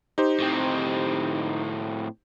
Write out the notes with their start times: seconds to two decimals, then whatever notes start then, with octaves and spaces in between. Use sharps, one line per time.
0.18 D#4 G4 C5
0.40 A2 C4